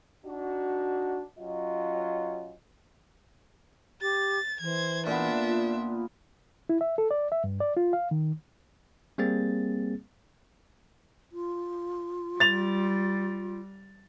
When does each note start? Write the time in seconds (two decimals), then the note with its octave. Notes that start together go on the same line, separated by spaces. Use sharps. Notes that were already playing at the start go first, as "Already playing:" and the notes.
0.25 D4 D#4 F#4
1.39 F#3 C#4 F4 D#5
4.02 G4 A6
4.61 E3 C5 G#6
5.07 A#2 B3 D4 E5
5.47 F4
6.69 E4
6.81 E5
6.98 A4
7.11 D5
7.32 E5
7.44 G2
7.60 D5
7.77 F4
7.93 F5
8.11 D#3
9.18 G3 A#3 C4 G#4 A6
11.32 F4
12.40 G3 A6 F7